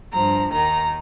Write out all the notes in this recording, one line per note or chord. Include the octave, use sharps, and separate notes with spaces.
G2 F3 A#5
D#2 D#3 A#5